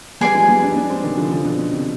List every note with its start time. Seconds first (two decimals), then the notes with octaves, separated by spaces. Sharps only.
0.21 G3 B3 G#4 D5 G#5
0.35 F3 G#3
0.49 G3 B3
0.62 B3 D4
0.71 D#4
0.75 B3 D4
0.90 G#3 C4
1.03 C3 D#3
1.17 D3 F3
1.31 D3 F3
1.45 B2 D3
1.59 B2
1.72 C3